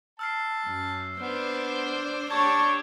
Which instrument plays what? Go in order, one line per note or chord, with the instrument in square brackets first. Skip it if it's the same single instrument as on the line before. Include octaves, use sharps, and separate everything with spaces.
[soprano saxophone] A5 [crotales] E6 F6 C7
[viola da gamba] F#2
[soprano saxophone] B3 [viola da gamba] D4 C5
[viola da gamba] D4 G4 C#5 [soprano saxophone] A5 [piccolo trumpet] C#6 [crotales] G#6